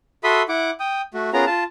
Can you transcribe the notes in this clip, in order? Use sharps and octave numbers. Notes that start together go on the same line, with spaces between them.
F#4 A4 E5 B5 C6 D#6
E4 F#5 D6
G5 D#6
A3 F#4
B3 C#4 F4 G#4 A#4 A#5
F4 A5